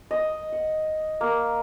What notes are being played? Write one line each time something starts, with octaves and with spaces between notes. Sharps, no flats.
D#5
F#5
A#3